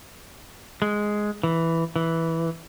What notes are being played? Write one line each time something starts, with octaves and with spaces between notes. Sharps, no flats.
G#3
E3
E3